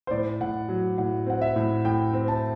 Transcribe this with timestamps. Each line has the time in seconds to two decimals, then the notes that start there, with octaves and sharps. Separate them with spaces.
0.07 C5
0.11 A2 D5
0.41 A2 F#5
0.69 F#3
0.98 A2 F#5
1.26 C4 F#5
1.41 E5
1.56 A2
1.85 A2 G5
2.13 C4
2.28 A5